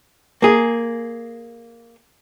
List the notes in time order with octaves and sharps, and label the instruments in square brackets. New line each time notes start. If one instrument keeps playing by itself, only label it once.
[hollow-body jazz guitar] A#3 G#4